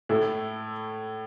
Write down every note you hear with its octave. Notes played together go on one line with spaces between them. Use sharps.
A2 A3 E4